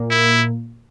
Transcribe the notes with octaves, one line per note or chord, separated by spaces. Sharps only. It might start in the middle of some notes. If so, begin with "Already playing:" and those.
Already playing: A#2 A#3
E4